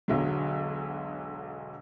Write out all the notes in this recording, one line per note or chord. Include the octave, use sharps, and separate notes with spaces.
E1 B1 D3 F#3